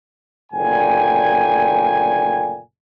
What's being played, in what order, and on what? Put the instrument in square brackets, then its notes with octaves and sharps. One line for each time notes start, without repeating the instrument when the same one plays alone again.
[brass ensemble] F#1 A#2 D3 A3 G5 G#5